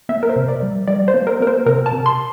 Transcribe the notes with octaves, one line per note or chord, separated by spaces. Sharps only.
A#3 E5
A#4
C5
C3
D5
G3
G3 D5
C5
A#3
A#4
A#3 A#4
C5
C3 A#4
A5
C3
C6